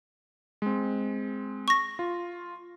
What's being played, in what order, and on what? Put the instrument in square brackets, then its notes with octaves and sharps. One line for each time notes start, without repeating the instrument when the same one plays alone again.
[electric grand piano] G#3 C4
[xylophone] C#6 A#6
[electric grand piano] F4